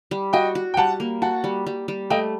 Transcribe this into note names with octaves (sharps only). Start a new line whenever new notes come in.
G3
F#4 D#5 G5
F#4
G5
G3 F#5 A5
A#3
F#4 F#5 A5
G3
G3
G3
A3 D#5 G5